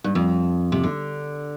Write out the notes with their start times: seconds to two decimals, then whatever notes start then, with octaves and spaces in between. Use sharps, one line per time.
0.04 G2
0.15 F2
0.72 C3
0.83 D3